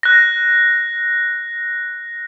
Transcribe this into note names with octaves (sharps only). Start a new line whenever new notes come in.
F#6 A#6